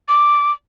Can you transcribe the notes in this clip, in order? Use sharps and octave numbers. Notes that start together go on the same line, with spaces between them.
D6